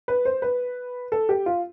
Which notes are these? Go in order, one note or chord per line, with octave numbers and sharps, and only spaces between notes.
B4
C5
B4
A4
G4
F4